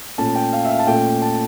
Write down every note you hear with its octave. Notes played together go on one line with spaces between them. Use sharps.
A#2 A3 C#4 A5
G5
F5
E5
F5
A5
A#2 A3 C#4 G5
A5